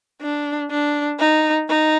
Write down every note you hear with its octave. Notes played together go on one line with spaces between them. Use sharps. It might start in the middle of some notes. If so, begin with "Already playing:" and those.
D4
D4
D#4
D#4